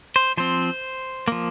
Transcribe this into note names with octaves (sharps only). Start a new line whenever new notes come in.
C5
F3 C4 C5
F3 A#3